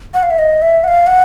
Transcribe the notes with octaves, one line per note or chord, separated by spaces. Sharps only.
F#5
F5
E5
D#5
E5
F#5
F5
F#5